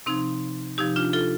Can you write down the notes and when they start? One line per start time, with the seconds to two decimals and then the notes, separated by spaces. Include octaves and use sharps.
0.06 C3 F3 C4 D#4
0.78 C3 F3 D#4 G4
0.96 D4 F4
1.13 F4 A4